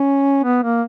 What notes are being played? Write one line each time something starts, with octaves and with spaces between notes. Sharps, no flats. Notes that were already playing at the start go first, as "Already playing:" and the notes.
Already playing: C#4
B3
A#3